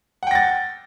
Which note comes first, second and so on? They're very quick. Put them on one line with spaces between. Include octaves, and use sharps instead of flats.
F#5 G5 A#6 A6